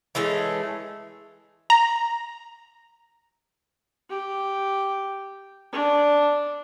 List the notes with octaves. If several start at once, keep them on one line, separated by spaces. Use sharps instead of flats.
E3 G#3 A3 C#4
A#5
G4
D4